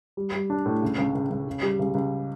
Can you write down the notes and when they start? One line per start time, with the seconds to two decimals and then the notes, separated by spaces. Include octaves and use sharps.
0.17 G3
0.34 G3
0.50 D4
0.66 A2
0.82 C#3
0.98 C#2
1.15 C#2
1.30 C#2
1.47 C#3
1.62 G3
1.79 C#2
1.95 C#2